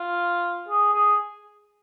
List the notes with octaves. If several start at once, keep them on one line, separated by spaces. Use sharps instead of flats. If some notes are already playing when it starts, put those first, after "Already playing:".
Already playing: F4
G#4
G#4